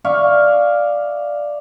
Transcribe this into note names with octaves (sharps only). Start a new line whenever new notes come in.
D5 E5 F5 C#6